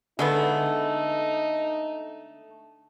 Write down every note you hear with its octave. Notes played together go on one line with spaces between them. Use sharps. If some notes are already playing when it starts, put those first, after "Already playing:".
D3 G#3 A3 B3 D#4